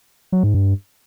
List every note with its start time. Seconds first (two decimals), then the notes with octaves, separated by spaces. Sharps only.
0.32 F#3
0.43 G#2
0.54 G2